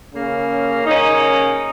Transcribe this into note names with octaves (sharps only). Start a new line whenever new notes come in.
C#3 A#3 C#4
C#3 A#3 C#4 D#4
D#4